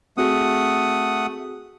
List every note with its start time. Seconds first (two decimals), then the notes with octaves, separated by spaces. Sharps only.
0.18 A3 C4 F#4 G#4 F#5 D#6